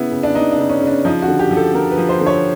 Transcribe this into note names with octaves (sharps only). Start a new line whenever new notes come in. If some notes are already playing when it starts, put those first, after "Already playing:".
Already playing: C#3 B3 E4
C#3
D4
B3 D#4
D4
C#3
C#4
C#3
D4
F3 D#4
F#4
D3
G4
F3
A4
D3 A#4
B4
F3
C5
D3
C#5